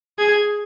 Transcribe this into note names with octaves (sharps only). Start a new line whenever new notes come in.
G#4 G#6